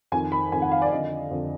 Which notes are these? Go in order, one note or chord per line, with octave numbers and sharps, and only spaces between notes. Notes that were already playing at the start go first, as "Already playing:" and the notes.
F2 D#3 G#5
B5
F2 D#3 G#5
F#5
F5
D5
F2 D3 D#5
F2 D3